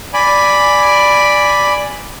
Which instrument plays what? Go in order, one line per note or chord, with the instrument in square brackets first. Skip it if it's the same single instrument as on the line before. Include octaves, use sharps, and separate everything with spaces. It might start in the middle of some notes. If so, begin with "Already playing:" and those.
[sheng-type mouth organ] D5 G#5 B5